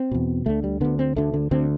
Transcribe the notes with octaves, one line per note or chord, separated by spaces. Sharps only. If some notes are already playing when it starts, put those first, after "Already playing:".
Already playing: C4
E2 B2
D2 D3 A3
G3
D2 D3 B3
C4
D2 D3 A3
D3
D2 D3 C4